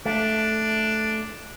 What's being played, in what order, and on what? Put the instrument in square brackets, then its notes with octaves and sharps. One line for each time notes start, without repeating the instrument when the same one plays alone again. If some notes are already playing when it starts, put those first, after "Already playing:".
[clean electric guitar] A3 [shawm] D4